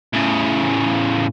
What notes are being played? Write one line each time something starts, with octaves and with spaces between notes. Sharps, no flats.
A2 C#3